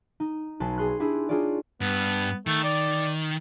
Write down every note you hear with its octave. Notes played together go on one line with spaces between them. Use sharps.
D#4
B1 B4 G#5 A5 C6
G#4 C6 F#6
D4 E4 G4 G#4
D4 D#4 F4 G#4 C#5 D5
G2 B3
D#3 A3
D5